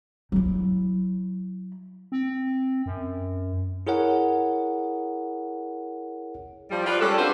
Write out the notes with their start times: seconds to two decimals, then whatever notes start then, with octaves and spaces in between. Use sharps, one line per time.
0.32 F#3 E4
2.12 C4
2.86 F#2
3.87 E4 G#4 A#4 C#5 F#5
6.70 F3 G3
6.85 F4 B4 D5
7.00 G3 G#3 C#4 G4 A4
7.17 C4 D4 F4 F#4 B4 C5